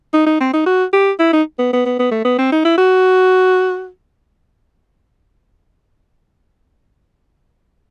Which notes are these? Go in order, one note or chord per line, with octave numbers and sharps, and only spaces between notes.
D#4
D#4
C4
D#4
F#4
G4
E4
D#4
B3
B3
B3
B3
A3
B3
C4
D#4
E4
F#4